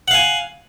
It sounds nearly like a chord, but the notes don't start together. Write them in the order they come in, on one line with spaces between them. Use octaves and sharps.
F#5 F5 G#5